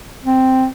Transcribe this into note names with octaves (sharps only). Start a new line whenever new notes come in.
C4